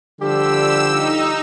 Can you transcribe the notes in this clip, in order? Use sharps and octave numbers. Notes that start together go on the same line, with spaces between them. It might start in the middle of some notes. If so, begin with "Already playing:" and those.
D3 F3 G3 G4 E6
D#4